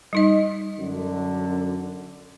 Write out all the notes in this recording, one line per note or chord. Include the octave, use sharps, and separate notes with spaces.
G3 D#4 D#5
F#2 D3